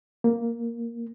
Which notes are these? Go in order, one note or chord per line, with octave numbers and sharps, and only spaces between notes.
A#3